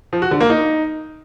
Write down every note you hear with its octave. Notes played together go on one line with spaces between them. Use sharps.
F3
F#4
D3
A#3
D#4